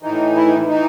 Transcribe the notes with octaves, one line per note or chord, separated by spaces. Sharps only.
A2 E3 D#4
E4
D#4
E3 D#4